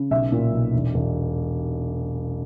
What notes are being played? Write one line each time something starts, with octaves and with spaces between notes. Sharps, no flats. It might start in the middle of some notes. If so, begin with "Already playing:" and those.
Already playing: C#3
B1 E5
A#2
B1
E1
E1